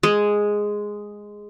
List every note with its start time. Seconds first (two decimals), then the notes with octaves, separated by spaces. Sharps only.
0.03 G#3